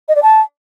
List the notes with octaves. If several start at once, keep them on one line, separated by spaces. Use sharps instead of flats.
D#5
D5
A5